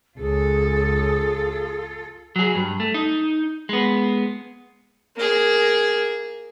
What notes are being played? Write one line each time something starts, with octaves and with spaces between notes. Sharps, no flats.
C#2 F4 G#4 A4
F#3 G#4
G2
A3
D#4
G#3 B3
A#3 G#4